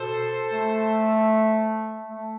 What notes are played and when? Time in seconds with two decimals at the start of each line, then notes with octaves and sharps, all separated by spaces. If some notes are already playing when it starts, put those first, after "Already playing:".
Already playing: B2 A4 C5
0.52 A3
2.09 A3